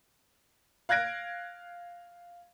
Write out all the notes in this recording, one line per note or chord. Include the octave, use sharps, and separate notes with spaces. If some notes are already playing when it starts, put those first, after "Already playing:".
F5 F#6 G#6 A#6 D7